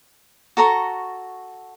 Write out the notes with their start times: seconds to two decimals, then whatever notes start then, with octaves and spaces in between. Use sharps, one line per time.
0.57 F#4 A4 A#5 C#6